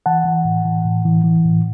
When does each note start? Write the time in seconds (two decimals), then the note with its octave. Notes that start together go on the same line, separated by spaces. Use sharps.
0.06 E3 F#5 A5
0.26 E3
0.45 A2
0.65 E3
0.85 A2
1.05 E3
1.24 E3
1.45 A2